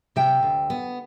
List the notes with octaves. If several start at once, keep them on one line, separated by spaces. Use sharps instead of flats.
C3 E5 G5
D2
B3